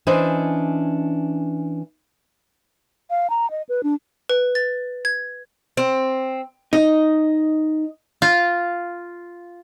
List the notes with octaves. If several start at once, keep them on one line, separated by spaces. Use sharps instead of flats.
E3 C#4 D4 C5 D5 D#5
F5
A#5
D#5
B4
D4
B4
A6
G#6
C4
D#4 D#5
F4